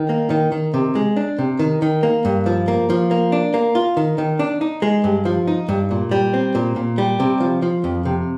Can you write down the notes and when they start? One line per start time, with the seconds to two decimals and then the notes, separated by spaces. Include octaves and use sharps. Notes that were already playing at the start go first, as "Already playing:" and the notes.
Already playing: D#3
0.09 A#3
0.30 D#3
0.52 D#3
0.74 C3
0.95 G#3
1.17 D4
1.39 C3
1.59 D#3
1.82 D#3
2.03 A#3
2.25 G2
2.46 F3
2.68 A#3
2.90 F3
3.11 A#3
3.32 D4
3.54 A#3
3.75 F4
3.97 D#3
4.18 D#3
4.39 D4
4.61 D#4
4.82 G#3
5.04 G2
5.25 F3
5.47 D#4
5.69 G2
5.91 A#2
6.11 G3
6.34 C4
6.55 A#2
6.76 A#2
6.98 G3
7.20 C3
7.40 F3
7.62 F3
7.84 F2
8.05 C3